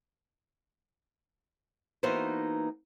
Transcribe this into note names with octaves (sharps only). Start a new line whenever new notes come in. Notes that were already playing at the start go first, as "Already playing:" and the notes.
E3 A#3 B3 D#4 F#4 C5